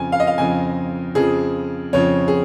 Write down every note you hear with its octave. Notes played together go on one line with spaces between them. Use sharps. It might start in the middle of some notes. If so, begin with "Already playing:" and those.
Already playing: F2 C#3 F3 G#5
F5
D#5
F5
F2 C#3 F3 G#5
F2 C#3 F3 G#4
F2 C#3 F3 C#5
G#4